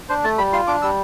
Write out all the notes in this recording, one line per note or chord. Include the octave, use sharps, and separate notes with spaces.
D4 C5
A3 A5
G3 B5
F4 C6
D4 D6
G3 E6